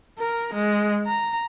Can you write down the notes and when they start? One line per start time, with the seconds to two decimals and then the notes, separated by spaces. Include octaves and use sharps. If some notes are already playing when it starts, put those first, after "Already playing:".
0.18 A#4
0.54 G#3
1.06 A#5